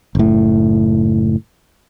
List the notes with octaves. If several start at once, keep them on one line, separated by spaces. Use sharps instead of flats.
F#1 A2